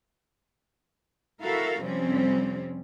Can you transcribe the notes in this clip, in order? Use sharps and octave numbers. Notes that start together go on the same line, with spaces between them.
E4 F#4 A4 A#4 E5 F5
F2 C3 F3 G3 C4 C#4